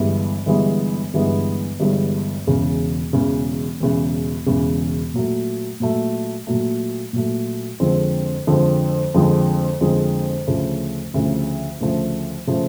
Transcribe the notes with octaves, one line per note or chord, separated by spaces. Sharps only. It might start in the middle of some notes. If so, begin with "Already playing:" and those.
Already playing: G1 G2 E3 G#3 B3
G1 G2 E3 G#3 B3
G1 G2 E3 G#3 B3
G1 G2 E3 G#3 B3
E1 E2 C#3
E1 E2 C#3
E1 E2 C#3
E1 E2 C#3
A#2 F#3 A3
A#2 F#3 A3
A#2 F#3 A3
A#2 F#3 A3
F2 D3 F3 G#3 C4
F2 D3 F3 G#3 C4
F2 D3 F3 G#3 C4
F2 D3 F3 G#3 C4
D2 C#3 F3 A3
D2 C#3 F3 A3
D2 C#3 F3 A3
C#3 F3 A3